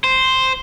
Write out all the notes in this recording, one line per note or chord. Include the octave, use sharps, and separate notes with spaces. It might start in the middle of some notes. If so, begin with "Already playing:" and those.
C5